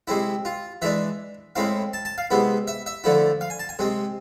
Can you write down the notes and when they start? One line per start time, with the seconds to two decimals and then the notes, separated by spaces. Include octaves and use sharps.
0.08 C3 G#3 C4 E4
0.45 F4
0.82 E3 G#3 D4 E5
1.56 A2 G#3 C4 E4 F5
1.93 A5
2.05 A5
2.18 F5
2.30 C3 G#3 B3 E4
2.68 E5
2.86 E5
3.04 D3 F3 A3 E4
3.41 F5
3.50 G#5
3.59 A5
3.69 G#5
3.79 C3 G#3 C4